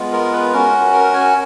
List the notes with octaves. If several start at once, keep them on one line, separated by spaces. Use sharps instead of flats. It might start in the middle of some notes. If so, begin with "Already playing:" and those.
Already playing: G#3 B3 F4
A#4
B4
C#4 F#4 A#4
A#4
G#5